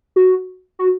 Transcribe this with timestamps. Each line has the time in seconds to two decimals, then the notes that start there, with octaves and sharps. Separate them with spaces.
0.16 F#4
0.79 F#4